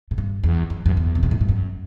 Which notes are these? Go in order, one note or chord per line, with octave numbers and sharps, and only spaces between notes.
A2
G2
E2
F#2
F#2
E2
C3
B2
A2
G2
F#2